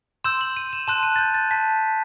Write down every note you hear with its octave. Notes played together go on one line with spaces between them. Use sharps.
C6 E6 G6 E7
F#7
D#7
E7
A5 C6 F#6 E7
D#7
A6
G6
A6
A5 B6